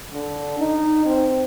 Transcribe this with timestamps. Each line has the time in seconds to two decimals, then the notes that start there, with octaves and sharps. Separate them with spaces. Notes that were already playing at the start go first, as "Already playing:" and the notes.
0.13 D3
0.60 D#4
1.06 C4